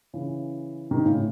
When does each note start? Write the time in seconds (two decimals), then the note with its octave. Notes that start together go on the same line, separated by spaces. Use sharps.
0.13 C#3 E3
0.91 C3 D#3
1.05 A2 C#3